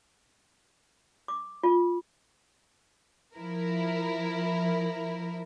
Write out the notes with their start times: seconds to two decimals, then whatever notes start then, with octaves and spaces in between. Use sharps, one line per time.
1.28 D6
1.63 F4
3.37 F3 E4 A#4